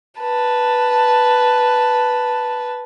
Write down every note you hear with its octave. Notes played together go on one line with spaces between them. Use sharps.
B4 A5